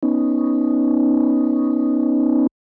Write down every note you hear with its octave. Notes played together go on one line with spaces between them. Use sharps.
B3 C#4 D#4